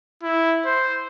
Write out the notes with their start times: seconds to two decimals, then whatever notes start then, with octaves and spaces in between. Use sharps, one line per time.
0.23 E4
0.66 C5